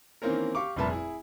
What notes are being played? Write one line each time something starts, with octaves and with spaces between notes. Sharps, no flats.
D#3 E3 A#3 C4 C#4 A#4
G4 F5 C#6 D6
F1 G2 A#2 B4 E5 A5
E4 G#4